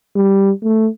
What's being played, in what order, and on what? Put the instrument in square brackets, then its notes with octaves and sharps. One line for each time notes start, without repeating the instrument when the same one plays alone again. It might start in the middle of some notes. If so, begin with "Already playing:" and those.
[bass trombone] G3
A3